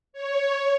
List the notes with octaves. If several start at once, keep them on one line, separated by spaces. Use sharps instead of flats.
C#5